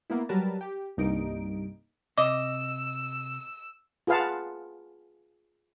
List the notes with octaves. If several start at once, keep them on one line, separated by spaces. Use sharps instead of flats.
A#3 B3 E4
F#3 G3 A#4 B4 A5
G4
C2 G2 A#3 D#4 D7
C3 D#5 D6 E6
F4 G#4 B4 F5 F#5 A5